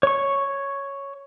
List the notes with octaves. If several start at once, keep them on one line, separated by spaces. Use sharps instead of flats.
C#5 C#6